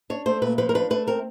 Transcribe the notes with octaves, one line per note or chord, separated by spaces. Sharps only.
D4 C#5
A3 C5
A#2 B4
F3 B4
A#4
D4 B4
A3 B4
C4 A#4